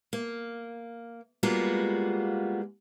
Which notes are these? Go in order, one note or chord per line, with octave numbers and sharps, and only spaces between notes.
A#3
G3 G#3 A#3 B3 F4 F#4